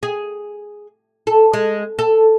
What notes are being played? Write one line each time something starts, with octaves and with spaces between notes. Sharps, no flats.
G#4
A4
G#3
A4